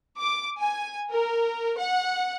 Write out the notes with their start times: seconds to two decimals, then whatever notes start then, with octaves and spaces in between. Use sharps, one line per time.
0.18 D6
0.58 G#5
1.09 A#4
1.77 F#5